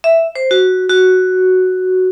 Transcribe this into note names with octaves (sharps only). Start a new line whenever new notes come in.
E5
C5
F#4
F#4